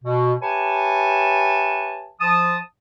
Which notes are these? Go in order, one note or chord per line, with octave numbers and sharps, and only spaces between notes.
B2
G4 B4 C#5 E5 G#5 A5
F3 A5 D#6